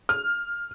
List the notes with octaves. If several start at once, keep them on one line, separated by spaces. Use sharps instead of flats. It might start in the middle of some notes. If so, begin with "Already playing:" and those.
F6